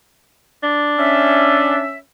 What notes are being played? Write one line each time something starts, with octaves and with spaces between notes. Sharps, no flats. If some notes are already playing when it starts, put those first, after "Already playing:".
D4
C#4 E5